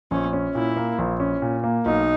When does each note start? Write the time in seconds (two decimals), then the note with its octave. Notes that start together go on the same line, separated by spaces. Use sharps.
0.11 A#1 C#4
0.33 C#4
0.55 A#2 E4
0.77 A#3
0.99 A#1
1.20 C#4
1.42 A#2
1.64 A#3
1.85 B1 D#4